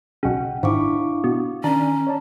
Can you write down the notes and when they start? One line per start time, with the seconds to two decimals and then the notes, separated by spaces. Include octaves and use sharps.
0.23 B1 C#3 F#5 G5
0.63 G#1 D4 E4 F5 C#6 D6
1.24 B2
1.64 D#3 C#4 D4 A#5
2.07 C#5 D5 A5